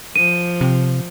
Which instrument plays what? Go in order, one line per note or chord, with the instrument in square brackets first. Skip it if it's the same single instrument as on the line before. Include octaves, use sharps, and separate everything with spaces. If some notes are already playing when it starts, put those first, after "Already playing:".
[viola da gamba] F3 [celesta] D#7
[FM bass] C3